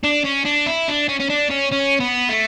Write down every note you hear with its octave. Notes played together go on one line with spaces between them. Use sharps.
D4
C#4
D4
E4
D4
C#4
C#4
D4
C#4
C#4
B3
A3